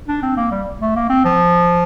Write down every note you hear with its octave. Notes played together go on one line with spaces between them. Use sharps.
D4
C4
A#3
G3
A3
A#3
C4
F3